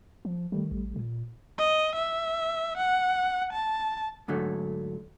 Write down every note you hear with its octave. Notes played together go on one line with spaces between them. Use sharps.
F3
D#3 G3 A3
A1
A#2
D#5
E5
F#5
A5
G#2 D3 F#3 A3